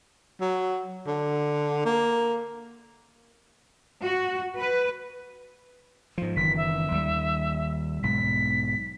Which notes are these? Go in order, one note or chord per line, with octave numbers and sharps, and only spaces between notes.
F#3
D3
A#3
F#4
B4
G#2 F3
F#1 D#3 E3 B6
E5
D#2 G3
B1 G#2 B6